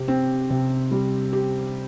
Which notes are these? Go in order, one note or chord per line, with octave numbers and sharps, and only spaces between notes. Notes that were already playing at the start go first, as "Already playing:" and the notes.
Already playing: C3 G4
C4
C3
G3
G4